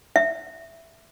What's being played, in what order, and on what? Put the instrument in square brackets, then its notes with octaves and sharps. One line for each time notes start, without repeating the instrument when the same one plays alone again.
[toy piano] E5